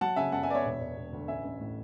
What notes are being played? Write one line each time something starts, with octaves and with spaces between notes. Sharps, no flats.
F#3 F#5 A5
C#3 E5 G#5
F#2 F#5 A5
E5 G#5
B3 D5
C#5 E5
E1
E1
E1
D2
A1 E5 G#5
A1
A2